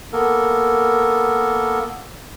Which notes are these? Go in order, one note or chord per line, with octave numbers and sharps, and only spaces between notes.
A#3 B3 A4 A#4